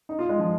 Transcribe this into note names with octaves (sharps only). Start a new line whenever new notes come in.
D#4
F4
G#3
F3